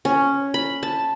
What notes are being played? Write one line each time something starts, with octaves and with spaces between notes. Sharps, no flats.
C#4
B5
A5